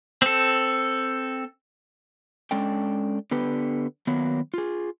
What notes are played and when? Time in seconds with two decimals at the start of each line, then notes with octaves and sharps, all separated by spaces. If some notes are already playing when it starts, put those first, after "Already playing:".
0.22 C4 A4
2.51 G#3 C#4 D4 A4 G5
3.31 D3 B3 D4 G4 B4
4.07 D#3 F#3 A#3 B3
4.54 F4 G#4